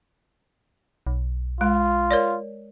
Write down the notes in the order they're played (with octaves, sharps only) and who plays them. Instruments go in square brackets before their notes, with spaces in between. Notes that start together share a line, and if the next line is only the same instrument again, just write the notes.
[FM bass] B1
[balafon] G#3 [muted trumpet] F4
[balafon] A#4 C#5 D5